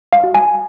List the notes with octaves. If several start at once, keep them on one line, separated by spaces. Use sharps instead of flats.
F5
F#4
G#5